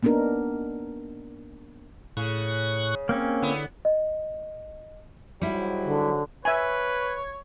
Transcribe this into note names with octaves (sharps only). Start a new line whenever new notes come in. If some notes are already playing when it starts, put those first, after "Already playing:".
A#3 B3 D4 D#4 A#4
A2 C#3 C#6 F#6
A#3 C4 C#4
D3 B3 E4
D#5
G#2 F#3 G3 E4
D3
B4 C#5 E5 G#5